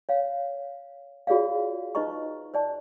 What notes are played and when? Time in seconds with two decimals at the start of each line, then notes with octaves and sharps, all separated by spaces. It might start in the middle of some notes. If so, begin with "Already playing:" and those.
0.09 C#5 F5
1.27 F4 F#4 G#4 C#5 D5 F5
1.95 D#4 B4 C5 D#5 A#5 C#6
2.54 C5 D5 A5